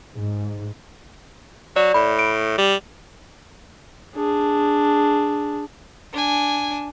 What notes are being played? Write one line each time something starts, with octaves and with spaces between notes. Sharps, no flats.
G#2
F#3 D5
A2 B5
D7
G3
D4 G#4
D4 G#5